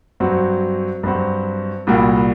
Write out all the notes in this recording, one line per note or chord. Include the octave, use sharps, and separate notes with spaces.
G2 F#3 C4 F#4
G2 F#3 C4 F#4
C2 A#2 G3 A#3 F#4